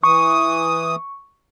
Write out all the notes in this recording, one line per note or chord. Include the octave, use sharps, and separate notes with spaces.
E3 C#6 D#6